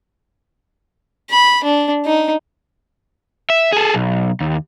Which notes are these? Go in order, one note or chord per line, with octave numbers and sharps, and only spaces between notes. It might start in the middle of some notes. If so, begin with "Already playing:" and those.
B5
D4
D#4
E5
G#4 A4
B1
D#2